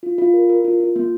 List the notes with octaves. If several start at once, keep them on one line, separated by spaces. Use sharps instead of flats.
F4
F4
A#4
A#4
F4
F4
A#3